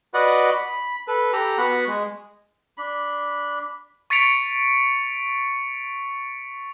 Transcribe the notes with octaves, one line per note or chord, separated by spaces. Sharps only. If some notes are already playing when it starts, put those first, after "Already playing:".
F#4 B4 D5 D#5 F#5
B5
A4 B4
G4 A4 A#5
B3 F#4 F#5 B5
G#3
D4 B5
C#6 A6 B6 C#7 D7 F7